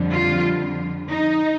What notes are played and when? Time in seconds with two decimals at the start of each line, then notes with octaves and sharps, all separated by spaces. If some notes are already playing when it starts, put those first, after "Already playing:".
Already playing: F2 D3 G3
0.12 F4
1.09 D#4